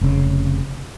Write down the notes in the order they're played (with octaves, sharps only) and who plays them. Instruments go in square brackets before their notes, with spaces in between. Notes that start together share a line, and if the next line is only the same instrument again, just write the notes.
[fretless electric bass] F1 C#3